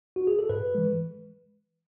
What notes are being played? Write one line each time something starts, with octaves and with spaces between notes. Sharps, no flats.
F#4
G#4
A4
G#2 B4
E3 G#3